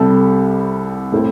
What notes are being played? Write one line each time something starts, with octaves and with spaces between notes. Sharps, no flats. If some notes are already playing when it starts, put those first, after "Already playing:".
Already playing: C2 C3 G3 A4
A2 A3 C4 E4